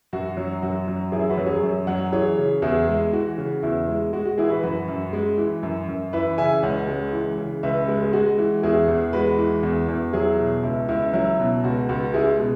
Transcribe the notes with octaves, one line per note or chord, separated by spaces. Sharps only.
F#2 F#4
F#3
F#2 F#4
F#3
F#2 E4 G#4
F#4 B4
F#3
G#4 C#5
F#2
F#3 C#5 F#5
E3 G#4 C#5
C#3
E2 E4 G#4
G#3
E3 F#4
C#3
E2 E4
G#3
G#3 F#4
F#4
E3 E4 G#4
F#4 B4
F#2 F#4 B4
F#2
G#3
E3
F#2
F#2
E3 B4 E5
C#3 E5 G#5
C#2 C#5 F#5
G#3
E3
C#3
C#2 B4 E5
G#3
G#4
G#3 F#4
E3
E2 E4 G#4
E2
G#3 F#4 B4
E3
E2
E2
F#3 E4 G#4
B2
C#2 E4
C#2 E4
F#3 E4
B2
C#2 F#4
C#2 F#4
G#3 E4 G#4
B2